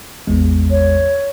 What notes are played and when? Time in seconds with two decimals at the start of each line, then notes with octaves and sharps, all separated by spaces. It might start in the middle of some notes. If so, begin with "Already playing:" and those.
0.27 A1 E2 G#3
0.71 C#5